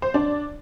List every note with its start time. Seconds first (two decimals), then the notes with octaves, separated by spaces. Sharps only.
0.02 C5
0.14 D4 D5